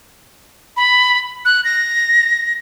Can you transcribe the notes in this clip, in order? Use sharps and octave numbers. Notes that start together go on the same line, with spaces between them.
B5
F#6
A#6